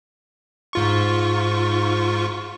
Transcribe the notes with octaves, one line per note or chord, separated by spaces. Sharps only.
G#2 F4 C#6